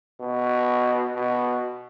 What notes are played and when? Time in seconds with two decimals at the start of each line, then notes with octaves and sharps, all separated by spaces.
0.20 B2
1.14 B2